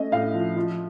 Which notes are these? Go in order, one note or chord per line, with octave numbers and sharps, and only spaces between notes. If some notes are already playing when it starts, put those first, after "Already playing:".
Already playing: A3 C#4 D#5
A2 F5
F3
F3